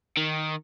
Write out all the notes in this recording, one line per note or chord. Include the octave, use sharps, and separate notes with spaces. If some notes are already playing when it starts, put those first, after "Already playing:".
D#3